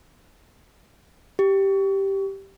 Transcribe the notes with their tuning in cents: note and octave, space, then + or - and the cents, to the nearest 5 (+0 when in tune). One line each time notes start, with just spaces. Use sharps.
G4 -5